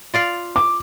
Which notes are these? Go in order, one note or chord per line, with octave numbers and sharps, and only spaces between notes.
F4 D5 F5
D6